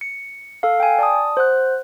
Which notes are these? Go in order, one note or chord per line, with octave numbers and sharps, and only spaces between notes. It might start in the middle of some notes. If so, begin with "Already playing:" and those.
C#7
A4 F5
G5 G#5
D5 A5 D#6
C5 F#5 F#6